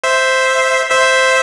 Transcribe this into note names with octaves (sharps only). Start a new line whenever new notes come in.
C5 E5
C5 E5